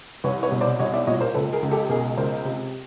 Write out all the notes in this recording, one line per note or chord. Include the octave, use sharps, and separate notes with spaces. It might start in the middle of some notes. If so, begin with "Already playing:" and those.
C2 B4 C#5
B4 C#5
B2
C5 D5
C2 C#5 D#5
D5 E5
A#2 C#5 D#5
A#4 C5
C#2 A4 B4
G#4 A#4
C#2
G4 A4
B2 G#4 A#4
C#2 A#4 C5
C3